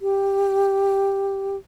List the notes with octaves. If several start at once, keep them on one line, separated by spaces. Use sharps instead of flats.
G4